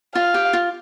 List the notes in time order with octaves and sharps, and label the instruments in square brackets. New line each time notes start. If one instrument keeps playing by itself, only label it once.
[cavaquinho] F4 [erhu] F5
[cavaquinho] G4
F4